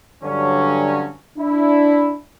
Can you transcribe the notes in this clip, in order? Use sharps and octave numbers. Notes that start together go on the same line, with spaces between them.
G2 D3 F#3 C#4
D4 E4